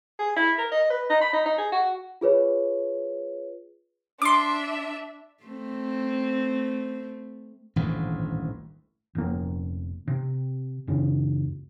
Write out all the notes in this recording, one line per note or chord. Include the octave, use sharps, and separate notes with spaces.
G#4
E4
A#4
D#5
B4
D#4
B5
D#4
D#4
G#4
F#4
F4 G#4 B4 C#5
D4 E5 C6 D6
A3 C4
D#1 A1 D2 G#2
F1 A#3
C3
C#2 F#2 C#3